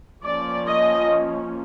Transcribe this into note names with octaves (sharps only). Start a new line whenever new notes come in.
F3 A#3 C#4 D5
D#5